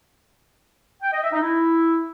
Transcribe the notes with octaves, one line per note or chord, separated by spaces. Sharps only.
G5
D#5
E5
D#4
E4